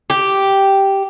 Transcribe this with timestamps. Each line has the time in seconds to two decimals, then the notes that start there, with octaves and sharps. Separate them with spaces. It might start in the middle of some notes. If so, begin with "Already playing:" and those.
0.10 G4